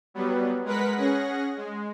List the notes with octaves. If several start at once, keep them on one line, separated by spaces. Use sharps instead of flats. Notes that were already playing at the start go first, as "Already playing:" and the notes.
F#3 G3 B3
G#3 A#4 B4 F#5 B6
C#4 G#4 F#5 A#6
G#3